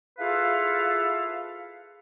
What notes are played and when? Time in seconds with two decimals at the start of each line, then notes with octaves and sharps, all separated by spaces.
0.19 E4 F4 G#4 A4 B4 F5